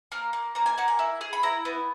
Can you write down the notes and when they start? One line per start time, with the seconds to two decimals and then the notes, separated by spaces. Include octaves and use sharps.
0.12 A#3 A#4
0.33 A#3
0.55 A#3 A#5
0.66 G#5
0.78 A#3 F#5
0.88 G#5
0.99 E4
1.21 G#4
1.33 B5
1.43 E4 A#5
1.65 B3